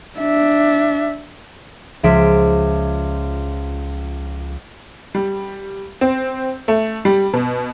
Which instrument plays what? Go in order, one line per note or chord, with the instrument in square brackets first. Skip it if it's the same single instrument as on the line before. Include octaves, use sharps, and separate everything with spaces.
[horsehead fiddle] D4 E5
[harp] C#2 F3 E5 D7
[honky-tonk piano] G3
C4
A3
G3
B2